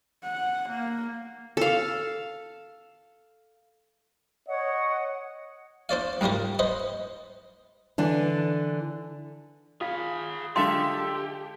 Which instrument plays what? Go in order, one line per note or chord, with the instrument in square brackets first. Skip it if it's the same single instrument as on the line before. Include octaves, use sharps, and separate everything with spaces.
[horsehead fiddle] F#5
A#3
[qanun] A4 F5
[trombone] C#5 [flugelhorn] D#5 [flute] F#5
[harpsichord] D4 C5 D5 F5
C#2 G#2 G3 F4 A#4
B4 C5 D#5
[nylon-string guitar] D3 E3 D4
[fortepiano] F4 [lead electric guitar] G#4 B5
[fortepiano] D3 G#3 F4 [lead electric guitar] G4 [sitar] A4 E5 [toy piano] C6